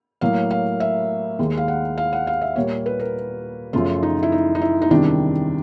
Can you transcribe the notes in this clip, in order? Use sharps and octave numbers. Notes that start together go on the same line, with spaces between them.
A2 F#3 A#3 F5
F5
E5
D#2 D#3 G#3
F5
F#5
F5
F#5
F5
E5
A#2 G3 A#3 C#5
B4
A#4
F#2 C#3 F3 A3 F4
D#4
E4
D#4
D#4
E4
D#4
E2 C3 D#3 G3 D4